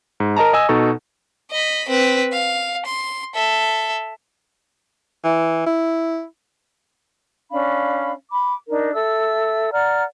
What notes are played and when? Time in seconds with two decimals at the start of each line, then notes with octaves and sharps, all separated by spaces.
0.20 G#2
0.37 A#4 D#5 A5 A#5
0.53 D#5 G#5 E6
0.69 B2 D#4 A4 A#5 C#6
1.51 D#5 B5
1.88 C4 B4
2.32 F5
2.85 C6
3.35 A4 E5
5.24 E3
5.66 E4
7.51 C#4 D4 F5 B5
8.31 B5 D6
8.68 D4 D#4 A#4
8.93 A4 E5 E6
9.72 D5 F#5 A#5 F6